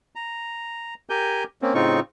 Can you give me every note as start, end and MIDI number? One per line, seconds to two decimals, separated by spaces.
0.15 0.94 82
1.10 1.44 67
1.10 1.44 70
1.10 1.44 80
1.10 1.44 91
1.62 1.74 58
1.62 1.74 60
1.62 1.74 61
1.75 2.00 45
1.75 2.00 49
1.75 2.00 60
1.75 2.00 63
1.75 2.00 65
1.75 2.00 85